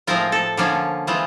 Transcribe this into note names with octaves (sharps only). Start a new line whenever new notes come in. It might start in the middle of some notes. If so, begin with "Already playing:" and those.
A2 F3 G#3 C4 F4 A#4
A4
D3 F3 A#3 C#4 F4
E3 G#3 C4 F4